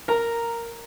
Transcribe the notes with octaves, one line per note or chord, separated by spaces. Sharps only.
A#4 A#5